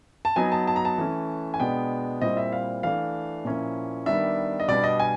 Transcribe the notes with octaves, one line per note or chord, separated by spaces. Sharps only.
A5
F#3 B3 D#4 G#5
A5
A5
A#5
A5
E3 A3 C#4
G#5
B2 G#3 B3 D4 G5
A#2 G3 C4 E4 D#5
E5
F5
E3 A3 D4 F5
A#2 F3 A#3 C#4 E4
D#3 G3 B3 D4 E5
D#5
B2 G3 B3 D4 D5
D#5
G#5